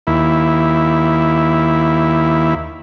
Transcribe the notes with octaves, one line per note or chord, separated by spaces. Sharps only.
D#2 E4